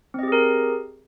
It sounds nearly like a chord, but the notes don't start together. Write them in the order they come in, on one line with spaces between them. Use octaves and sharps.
C4 D#5 G4 G#4 A#4